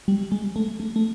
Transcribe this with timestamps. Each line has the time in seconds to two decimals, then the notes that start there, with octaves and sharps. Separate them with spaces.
0.08 G3
0.32 G#3
0.56 A3
0.80 A3
0.96 A3